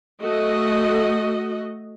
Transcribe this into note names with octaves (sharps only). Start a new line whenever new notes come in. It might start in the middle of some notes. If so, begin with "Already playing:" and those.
A3 F#4 D#5